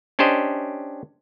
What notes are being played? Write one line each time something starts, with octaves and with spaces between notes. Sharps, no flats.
C#4 D4 G4 C5 D#5